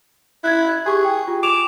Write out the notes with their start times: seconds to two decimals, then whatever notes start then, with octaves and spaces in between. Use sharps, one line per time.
0.44 E4 F#6 G#6
0.86 G4 G#4 C#6
1.05 G5
1.28 F4
1.43 D6 E7 F7